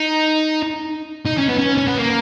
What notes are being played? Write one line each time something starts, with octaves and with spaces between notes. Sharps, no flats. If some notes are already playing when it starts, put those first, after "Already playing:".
Already playing: D#4
D#4
C#4
B3
C#4
C#4
B3
A#3